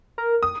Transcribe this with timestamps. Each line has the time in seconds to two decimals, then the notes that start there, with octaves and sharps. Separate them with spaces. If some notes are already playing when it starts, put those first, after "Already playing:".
0.18 A#4
0.43 D#6